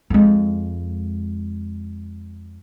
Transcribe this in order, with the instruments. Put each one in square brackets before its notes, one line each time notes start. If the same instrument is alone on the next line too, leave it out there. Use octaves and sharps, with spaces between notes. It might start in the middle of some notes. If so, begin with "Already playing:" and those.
[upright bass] F2 G#3